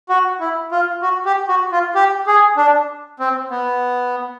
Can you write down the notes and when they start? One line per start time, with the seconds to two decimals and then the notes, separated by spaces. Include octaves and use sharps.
0.09 F#4
0.40 E4
0.72 F4
1.02 F#4
1.25 G4
1.48 F#4
1.72 F4
1.95 G4
2.27 G#4
2.57 D4
3.20 C4
3.51 B3